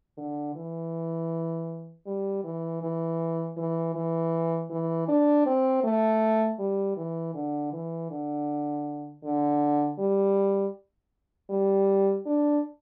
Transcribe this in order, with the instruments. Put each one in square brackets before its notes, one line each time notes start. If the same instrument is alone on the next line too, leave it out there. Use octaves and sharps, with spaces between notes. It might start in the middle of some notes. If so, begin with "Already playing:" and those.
[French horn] D3
E3
G3
E3
E3
E3
E3
E3
D4
C4
A3
G3
E3
D3
E3
D3
D3
G3
G3
D4